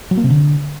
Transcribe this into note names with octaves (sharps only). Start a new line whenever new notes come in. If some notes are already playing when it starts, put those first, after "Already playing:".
F#3
A#3
C3
D3